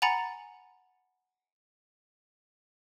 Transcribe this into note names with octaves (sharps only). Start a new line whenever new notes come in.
F#5 G#5 A#5 B5 A6 C#7